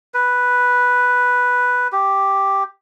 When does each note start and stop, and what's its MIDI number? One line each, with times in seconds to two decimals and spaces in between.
0.14 1.88 71
1.92 2.63 67